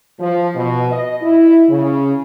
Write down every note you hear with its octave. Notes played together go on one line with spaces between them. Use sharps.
F3
B2
D#5
E4
C#3